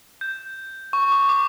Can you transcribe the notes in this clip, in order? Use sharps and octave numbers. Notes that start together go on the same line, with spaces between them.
G6
C#6
D6
D6